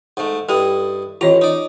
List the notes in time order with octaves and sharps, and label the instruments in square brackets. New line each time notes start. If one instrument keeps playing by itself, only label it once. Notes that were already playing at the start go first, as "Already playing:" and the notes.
[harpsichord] G#2 A3
[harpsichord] G2 E4 D#5 [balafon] A4
[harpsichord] A1 A#5 [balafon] F4 C#5 D#5
[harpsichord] D#4 D5